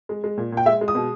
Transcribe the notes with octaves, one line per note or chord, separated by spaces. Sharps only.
G#3
G#3
A#2
A#2
G5
G#3 E5
G#3
D#6
B2